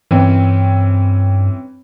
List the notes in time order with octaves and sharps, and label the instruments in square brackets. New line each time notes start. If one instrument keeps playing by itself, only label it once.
[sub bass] G2 [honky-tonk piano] E3 C4 C#4